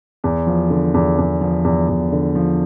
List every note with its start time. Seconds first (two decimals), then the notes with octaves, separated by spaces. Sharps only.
0.24 E2
0.47 F3
0.70 D3
0.94 E2
1.18 E2
1.41 F3
1.64 E2
1.88 E2
2.12 D3
2.35 F3